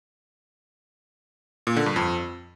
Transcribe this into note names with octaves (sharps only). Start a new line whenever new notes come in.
A#2
D3
G2
F2